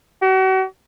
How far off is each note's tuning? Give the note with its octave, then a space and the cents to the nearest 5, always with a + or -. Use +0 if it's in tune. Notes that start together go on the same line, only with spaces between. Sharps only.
F#4 +40